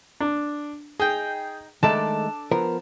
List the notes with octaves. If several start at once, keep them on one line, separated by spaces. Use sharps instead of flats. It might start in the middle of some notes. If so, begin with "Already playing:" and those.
D4
D#4 G#4 G5
D#3 G#3 A3 D4 A4 D5 A5
F3 B3 A#4